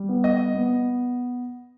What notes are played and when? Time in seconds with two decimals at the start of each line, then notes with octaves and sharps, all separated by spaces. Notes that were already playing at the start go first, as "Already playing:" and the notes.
Already playing: G3
0.09 B3
0.24 D#5
0.55 B3